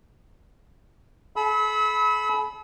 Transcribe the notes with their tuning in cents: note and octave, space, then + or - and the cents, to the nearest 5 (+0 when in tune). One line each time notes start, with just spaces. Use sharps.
A4 -45 B5 +0 E6 -40